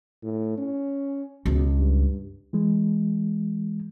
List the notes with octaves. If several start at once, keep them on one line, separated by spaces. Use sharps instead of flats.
A2
C#4
C#2 B2
G2
E3 G#3